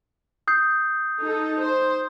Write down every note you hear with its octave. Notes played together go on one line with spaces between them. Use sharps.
D#6 G6 C7
D#4 A4
C5